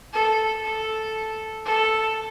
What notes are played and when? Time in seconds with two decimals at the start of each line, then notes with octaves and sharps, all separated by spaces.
0.13 A4
0.64 A4
1.65 A4